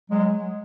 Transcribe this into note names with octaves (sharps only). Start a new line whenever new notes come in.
F#3 G#3